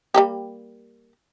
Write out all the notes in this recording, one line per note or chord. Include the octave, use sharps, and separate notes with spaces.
G3 A#3 G4